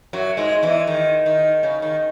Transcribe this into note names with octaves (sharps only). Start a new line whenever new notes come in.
F#2 F#3
G#2 G#3
E2 E3
D#3
D#3
C#3
D#3